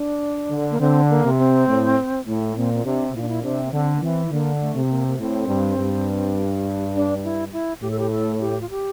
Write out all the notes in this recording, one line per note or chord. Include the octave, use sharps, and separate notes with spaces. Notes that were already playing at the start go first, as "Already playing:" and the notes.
Already playing: D4
D3
A#3
D3 C4
A#3
C3
C4
A2
A2
A#2 C4
C4
C3 D4
A#2 E4
D4
E4
C3 D4
A#3
D3 C4
A#3
E3 C4
D3 A#3
A3
C3
A#3
A#3
A2 C4
G2
G2
D4
E4
E4
A2 G4
A4
G4
A4
G4
F4
G4